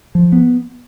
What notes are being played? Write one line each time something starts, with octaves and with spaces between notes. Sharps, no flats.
F3
B3